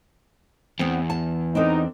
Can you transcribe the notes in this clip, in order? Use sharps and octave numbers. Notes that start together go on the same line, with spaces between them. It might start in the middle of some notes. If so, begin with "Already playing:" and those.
E2 B3 C4
A5
C4 D4 D#4 A4